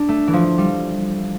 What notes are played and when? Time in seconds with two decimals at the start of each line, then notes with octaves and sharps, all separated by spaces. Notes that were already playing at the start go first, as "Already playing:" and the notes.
Already playing: D4
0.09 A3
0.27 E3
0.33 F3
0.58 G3